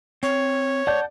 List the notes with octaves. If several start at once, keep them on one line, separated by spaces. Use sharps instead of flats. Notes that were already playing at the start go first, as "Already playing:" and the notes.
C4 C#5
D5 F#5 A5 G6